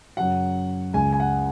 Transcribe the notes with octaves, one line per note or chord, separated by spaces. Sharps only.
F#2 C#3 F#3 F#5
C#2 C#3 G#3 G#5
G#5
F#5